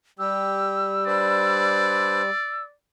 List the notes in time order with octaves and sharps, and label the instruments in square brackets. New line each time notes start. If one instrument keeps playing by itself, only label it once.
[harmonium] G3 [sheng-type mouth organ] G4 [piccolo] E6
[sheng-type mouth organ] D4 B4 C5 [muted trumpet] D5